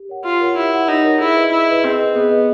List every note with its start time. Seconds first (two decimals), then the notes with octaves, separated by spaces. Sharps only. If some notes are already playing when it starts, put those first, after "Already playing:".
Already playing: G4
0.09 A#4 C#5 F#5
0.24 F4 G4
0.41 A#4 C#5 F#5
0.56 E4 G4
0.72 A#4 C#5 F#5
0.87 D#4 G4
1.04 A#4 C#5 F#5
1.19 E4 G#4
1.35 B4 D#5
1.52 E4 G#4
1.68 B4 D#5
1.83 C4 G#4
1.99 B4 D#5
2.15 B3 G#4
2.31 B4 D#5